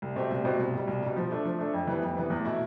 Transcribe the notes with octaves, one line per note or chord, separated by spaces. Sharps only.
C2
B2 A3 C4 G4
C2
B2 A3 C4 G4
C2
B2 G3
C2
B2 G3
F3
A3 D4 A4
F3
A3 D4 A4
F2
E3 G3 B3
F2
E3 G3 B3
E2
B2 A3 E4